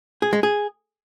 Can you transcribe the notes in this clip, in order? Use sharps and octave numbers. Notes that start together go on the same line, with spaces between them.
G#4
G#3
G#4